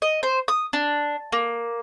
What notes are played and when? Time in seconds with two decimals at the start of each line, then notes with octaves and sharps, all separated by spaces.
0.02 D#5
0.23 C5
0.48 D#6
0.73 D4
1.32 A#3